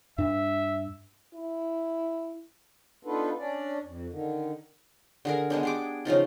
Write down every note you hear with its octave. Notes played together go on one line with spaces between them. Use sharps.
G2 D4 E5
E4
B3 D4 D#4 F4 A4 B4
C#4 D4 D5
F2
D3 D#3
D3 G#4 A#4
G#3 B3 D4
G4 G#4 D6
C#3 F3 D#4 F4